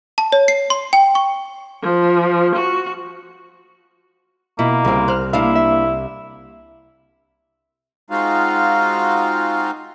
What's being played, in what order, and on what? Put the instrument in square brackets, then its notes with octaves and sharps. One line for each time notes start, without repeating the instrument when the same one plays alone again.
[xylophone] A5
C#5
C7
C6
G5
C#6
[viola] F3
F#4
[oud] B2 [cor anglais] A#3 [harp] E4
[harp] C2 [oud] C#3 C4
[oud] C5 [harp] F6 F#6
[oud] A#3 D4 F5 [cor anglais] E4
[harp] E5
[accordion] G#3 C4 D#4 F4 F#4 F5